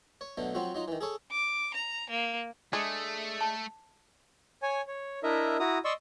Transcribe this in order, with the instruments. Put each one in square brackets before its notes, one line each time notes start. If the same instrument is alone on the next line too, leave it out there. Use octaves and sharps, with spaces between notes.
[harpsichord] C#5
B2 D3 F#3 A3
F3 F#3 C4 F4 F#4
F#3 D#4 F4
D#3 E3
G#4 A4 C#5
[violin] D6
A#5
A#3
[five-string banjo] G#3 D4 G#4 [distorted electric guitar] A3
[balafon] A5
[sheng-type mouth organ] C#5 G#5
C#5
D4 E4 A#4 D#5 E5
E4 F#4 A#5 D#6
D5 D#5 C6 C#6 E6